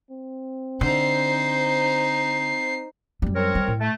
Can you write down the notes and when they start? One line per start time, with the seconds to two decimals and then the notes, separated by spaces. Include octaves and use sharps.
0.11 C4
0.81 D3 D#4 C5 C7
3.22 F#2 G3
3.35 C4 A#4 C#5
3.55 G3
3.67 A2
3.81 A3